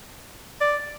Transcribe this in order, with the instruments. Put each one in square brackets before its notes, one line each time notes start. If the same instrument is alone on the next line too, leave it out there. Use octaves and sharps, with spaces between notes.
[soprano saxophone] D5